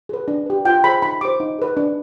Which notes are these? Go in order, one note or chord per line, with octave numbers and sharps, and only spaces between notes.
G#4 B4
D4
G4 B4
F4 G5
G#4 C5 B5
D#4 B5
G4 C5 D6
D#4
G#4 B4
D4